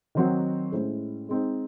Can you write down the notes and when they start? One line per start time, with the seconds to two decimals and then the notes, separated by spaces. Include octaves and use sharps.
0.15 D#3 F#3 C4 D#4 F#4
0.72 A2 G#3 C#4 E4 C5
1.29 G#3 C4 D#4